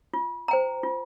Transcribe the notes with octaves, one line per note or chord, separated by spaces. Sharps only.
F4
C5 G5 A#5
F4